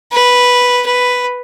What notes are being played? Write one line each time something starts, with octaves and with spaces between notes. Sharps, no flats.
B4
B4